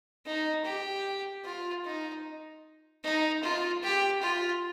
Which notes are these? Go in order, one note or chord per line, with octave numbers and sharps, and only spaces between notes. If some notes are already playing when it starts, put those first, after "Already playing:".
D#4
G4
F4
D#4
D#4
F4
G4
F4